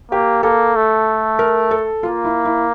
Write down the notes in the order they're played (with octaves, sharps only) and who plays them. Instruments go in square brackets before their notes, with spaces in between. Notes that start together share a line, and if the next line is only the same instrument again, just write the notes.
[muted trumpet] A#3 [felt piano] G4
[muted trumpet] A#3 [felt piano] A4
[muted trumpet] A3
[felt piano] A#4
A4
[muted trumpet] A#3 [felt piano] F4
[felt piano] E4
E4